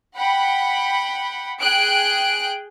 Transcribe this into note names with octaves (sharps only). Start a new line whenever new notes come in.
F#5 G5 B5
G#4 G5 F#6 D7